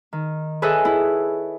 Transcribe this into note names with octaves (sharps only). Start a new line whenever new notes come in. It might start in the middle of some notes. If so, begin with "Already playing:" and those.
D#3
G#4 A4 B4 C#5 D#5 E5
E4